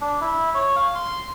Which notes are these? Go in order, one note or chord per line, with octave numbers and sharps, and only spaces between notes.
D4
E4
C#5
F5
C6